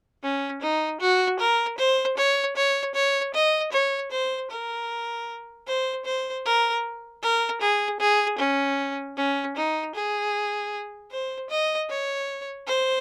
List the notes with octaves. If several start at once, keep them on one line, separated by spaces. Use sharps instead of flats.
C#4
D#4
F#4
A#4
C5
C#5
C#5
C#5
D#5
C#5
C5
A#4
C5
C5
A#4
A#4
G#4
G#4
C#4
C#4
D#4
G#4
C5
D#5
C#5
C5